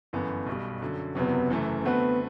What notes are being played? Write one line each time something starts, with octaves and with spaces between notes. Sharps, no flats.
G1 F#2 E3 B3
B1 B2 G3
F#2 D3 F#3
F#1 E2 C3 F#3 B3
F#1 F#2 E3 A3
D3 A3 B3 C4 F#4 B4